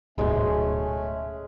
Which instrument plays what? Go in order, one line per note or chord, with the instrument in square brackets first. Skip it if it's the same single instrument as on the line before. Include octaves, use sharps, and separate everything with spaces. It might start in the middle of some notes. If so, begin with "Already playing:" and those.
[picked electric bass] D1 G#2 B2 [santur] G#3 C6 [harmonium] A3 C#4